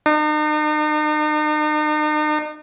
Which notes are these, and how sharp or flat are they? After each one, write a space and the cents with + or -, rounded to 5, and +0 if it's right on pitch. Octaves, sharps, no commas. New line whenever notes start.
D#4 -40